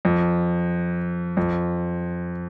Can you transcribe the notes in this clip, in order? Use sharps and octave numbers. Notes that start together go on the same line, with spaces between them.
F2
F2